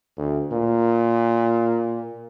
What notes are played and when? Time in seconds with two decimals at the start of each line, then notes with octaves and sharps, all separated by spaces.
0.17 D2
0.52 A#2